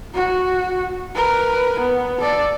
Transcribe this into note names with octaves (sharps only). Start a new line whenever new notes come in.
F#4
A#4 B4
B3
A4 D5